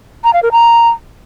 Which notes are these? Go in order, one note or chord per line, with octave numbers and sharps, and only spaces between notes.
A#5
F5
A#4
A#5